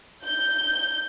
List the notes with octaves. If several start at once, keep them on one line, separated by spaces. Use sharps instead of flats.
G6